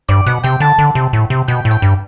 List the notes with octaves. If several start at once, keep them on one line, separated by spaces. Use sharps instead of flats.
G2 D5
B2 F#5
C3 G5
D3 A5
D3
C3
A2
C3
B2 G5
A2
G5
G2